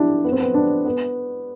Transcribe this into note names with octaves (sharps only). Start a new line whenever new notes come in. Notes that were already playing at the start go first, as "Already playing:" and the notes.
Already playing: D4 E4 G4
B3
C4
B3
D4
B3